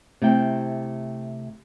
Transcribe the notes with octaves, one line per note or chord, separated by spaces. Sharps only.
C3 A3 E4 G5